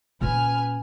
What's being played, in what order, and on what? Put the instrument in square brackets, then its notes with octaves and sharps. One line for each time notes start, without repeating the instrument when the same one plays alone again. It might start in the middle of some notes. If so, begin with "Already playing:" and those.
[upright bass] A#2 C#4 [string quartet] B4 G#5 F6